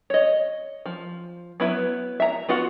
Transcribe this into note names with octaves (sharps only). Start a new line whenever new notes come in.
C#5 D#5
F3
F#3 B3 E4 B4 E5
E5 A#5
B3 F4 F#4 F#5